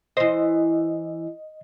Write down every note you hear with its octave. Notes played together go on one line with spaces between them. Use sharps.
E3 C5 D#5